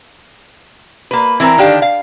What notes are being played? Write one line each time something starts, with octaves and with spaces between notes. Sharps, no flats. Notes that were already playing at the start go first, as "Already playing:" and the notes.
A#3 B4
E3 C4 A#4 A#5
D3 D#3 D4 G4 F5
F5